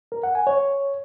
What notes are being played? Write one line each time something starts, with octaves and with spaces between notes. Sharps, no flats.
A#4
F#5
G#5
C#5